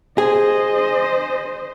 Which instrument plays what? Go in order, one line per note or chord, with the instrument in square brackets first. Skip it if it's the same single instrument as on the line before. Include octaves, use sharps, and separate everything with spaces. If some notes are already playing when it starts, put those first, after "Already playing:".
[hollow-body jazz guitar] G#4 [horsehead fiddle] C5 D#5